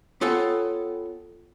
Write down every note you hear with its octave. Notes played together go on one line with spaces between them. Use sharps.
B3 F4 A4 C#5 G5 G#5